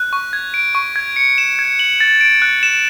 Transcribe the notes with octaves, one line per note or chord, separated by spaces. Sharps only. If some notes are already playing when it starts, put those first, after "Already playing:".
Already playing: F#6
C#6
G#6
D7
C#6
G#6
C#7
E7
G#6
F#7
A6
D7
F#6
E7